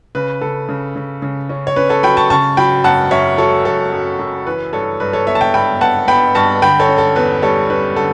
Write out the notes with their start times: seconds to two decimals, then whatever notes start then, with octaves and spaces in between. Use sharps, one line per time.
0.15 C#3 B4
0.41 C#3 A4
0.69 C#3
0.96 C#3
1.22 C#3
1.49 C#4
1.67 C#5
1.76 C#4 B4
1.89 A4 C#5
2.03 F#3 G5 B5
2.17 A5 C#6
2.30 C#3 A5 C#6
2.57 F#3 G5 B5
2.84 F#2 F#5 A5
3.11 F#2 C#5 E5
3.38 F#3 A4 C#5
3.65 F#2 A4
3.92 F#2
4.19 F#2
4.46 E3 B4
4.73 G2 A4 C#5
5.00 G2 B4
5.13 A4 C#5
5.27 B3 C#5 E5
5.35 A5
5.41 E5 G5
5.54 G2 G5 B5
5.81 B3 F#5 A5
6.08 B3 G5 B5
6.35 G2 A5 C#6
6.62 D3 G5 B5
6.80 A4 C#5
6.89 C#4
6.98 A4
7.16 E2 B4
7.42 G3 A4 C#5
7.70 C#4 B4
7.96 D3 A4